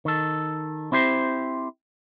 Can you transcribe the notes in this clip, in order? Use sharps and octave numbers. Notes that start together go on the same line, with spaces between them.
D#3 A4
C4 E4 G4 C5